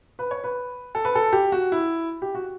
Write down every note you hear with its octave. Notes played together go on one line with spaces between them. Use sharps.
B4
C#5
B4
A4
B4
A4
G4
F#4
E4
G4
F#4